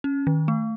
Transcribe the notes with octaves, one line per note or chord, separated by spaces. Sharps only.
C#4
D#3
A3